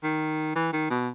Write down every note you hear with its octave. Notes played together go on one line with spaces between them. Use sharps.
D#3
E3
D#3
B2